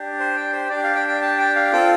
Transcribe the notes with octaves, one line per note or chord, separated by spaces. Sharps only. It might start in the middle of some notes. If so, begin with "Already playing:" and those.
Already playing: D4 G4
C5
G5
C5
D4 G4 D5
F5
G5
G5
A5
G5
F5
C4 F4 A4 G5